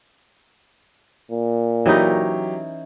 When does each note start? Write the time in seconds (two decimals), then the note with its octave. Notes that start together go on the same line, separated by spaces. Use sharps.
1.31 A#2
1.86 E3 F#3 C#4 D#4 G4